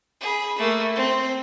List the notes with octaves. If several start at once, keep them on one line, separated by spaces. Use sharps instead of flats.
G#4 B5
A3 A#3
C4